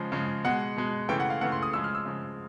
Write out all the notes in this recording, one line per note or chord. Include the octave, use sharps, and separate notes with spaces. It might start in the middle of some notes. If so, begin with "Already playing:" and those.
Already playing: C#3 F3 G#3
C#3 F3 G#3
B2 G#3 F#5
B2 G#3
C#3 E3 A3 G5
F#5
F5
C#3 E3 A3 F#5
C6
D#6
C#3 F3 G#3 E6
F6
E6
C#3 F3 G#3